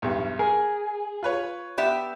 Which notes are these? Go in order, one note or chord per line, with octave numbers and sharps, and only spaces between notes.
B1 E2 G2
G#4 A#4
F4 B4 C#5
B3 G4 D5 E5